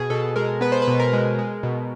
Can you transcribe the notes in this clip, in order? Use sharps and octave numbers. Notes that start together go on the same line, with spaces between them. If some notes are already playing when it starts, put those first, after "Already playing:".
Already playing: B2 G#4
B2 A4
G#3 A#4
B3 B4
C5
B4
B2
A#4
G#3
G#3
B2